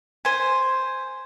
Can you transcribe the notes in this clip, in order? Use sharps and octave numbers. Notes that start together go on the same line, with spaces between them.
C5 G#5